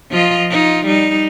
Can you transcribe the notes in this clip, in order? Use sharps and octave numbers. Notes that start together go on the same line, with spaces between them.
F3 F4 D#5
D#4 F4
G3 D#4